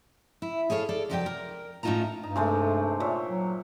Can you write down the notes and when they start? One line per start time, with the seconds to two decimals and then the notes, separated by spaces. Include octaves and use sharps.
0.42 E4
0.70 G#4 A4 C#5 D5 F5
0.89 A4 D5
1.10 F2 C3 F#3 G4 D5 G5
1.26 A#4
1.83 A2 C#4 D#4 F4 A5 A#5
2.23 G2 D#4
2.36 C3 G#3 A3
3.00 A#2 C#5 E5
3.29 F#3